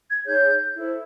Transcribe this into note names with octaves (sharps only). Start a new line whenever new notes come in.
G#6
D#4 G#4 C#5 G6
E4 A4 C5